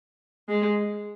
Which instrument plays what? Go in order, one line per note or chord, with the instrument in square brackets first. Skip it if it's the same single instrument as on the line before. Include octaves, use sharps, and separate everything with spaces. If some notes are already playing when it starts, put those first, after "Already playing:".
[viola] G#3